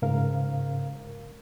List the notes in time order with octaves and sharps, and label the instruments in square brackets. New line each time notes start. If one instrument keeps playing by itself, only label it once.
[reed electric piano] G#2 C#3 A#4 F5